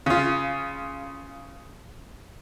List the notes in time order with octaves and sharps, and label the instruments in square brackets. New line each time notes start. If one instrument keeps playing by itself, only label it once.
[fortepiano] C#3 F4